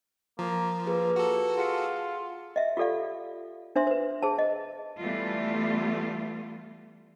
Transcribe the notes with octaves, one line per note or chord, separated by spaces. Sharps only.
F3 A#3 A#4 A#5
A#3 F4 G#4 B4
F#4 A4
F4 G#4 F#5 C#7
D#5 E5
F4 G4 A4 D5 F5
D4 C5 E5 C6
B4 C5
G#4 C5 A5
D#5
E3 G3 A3 B3 F4